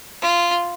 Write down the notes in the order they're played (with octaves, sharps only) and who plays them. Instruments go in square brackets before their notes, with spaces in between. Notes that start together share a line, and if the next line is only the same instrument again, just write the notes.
[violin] F4